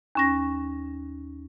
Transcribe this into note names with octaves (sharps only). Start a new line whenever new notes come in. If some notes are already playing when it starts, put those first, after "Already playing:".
D#2 C#4 A#6